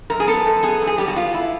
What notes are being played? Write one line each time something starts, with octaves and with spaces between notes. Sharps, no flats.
F#2 A#4
G#4
B3 A4
F#2
B3 G#4
F#2
G#4
G3 G4
F#4
B3 F4
B3 E4